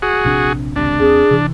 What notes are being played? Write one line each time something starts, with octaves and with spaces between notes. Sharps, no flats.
F#4 G#4
A#1 C3 D4
G#1 C#2 C3 D4
E2 C4 G#4
C3 E3